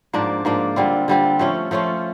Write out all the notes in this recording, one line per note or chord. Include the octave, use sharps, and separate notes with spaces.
G#2 F3 A#3 D4
G#2 F3 A#3 D4
D3 G3 C4 F4
D3 G3 C4 F4
F3 A3 C#4 F4
F3 A3 C#4 F4